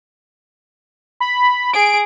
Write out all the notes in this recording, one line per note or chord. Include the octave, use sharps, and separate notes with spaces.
B5
G#4 D7